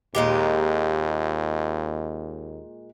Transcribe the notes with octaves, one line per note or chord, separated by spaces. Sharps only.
D#2 A#2 G#3 G4